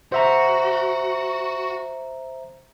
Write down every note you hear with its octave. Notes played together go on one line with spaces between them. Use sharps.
F#4 C5 E5 A#5